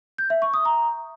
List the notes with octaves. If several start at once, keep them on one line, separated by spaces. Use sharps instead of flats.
G6
E5
C#6
D#6
A#5